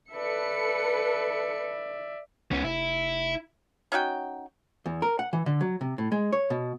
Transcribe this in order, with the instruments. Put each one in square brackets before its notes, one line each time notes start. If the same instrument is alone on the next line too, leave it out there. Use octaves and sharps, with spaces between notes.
[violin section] A4 B4 C#7 [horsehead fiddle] D5 E5
[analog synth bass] C#2 [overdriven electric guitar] B3 C#4
[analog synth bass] F1 [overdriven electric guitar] E4
[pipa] C#4 D#4 F#4 G5
[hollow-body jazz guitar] E2
A#4
F#5
E3
D3
F#3
C3
A2
G#3
C#5
B2